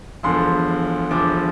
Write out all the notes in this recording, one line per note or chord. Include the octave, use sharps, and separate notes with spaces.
E1 E2 D3 F3 C6
E1 E2 D3 F3 D6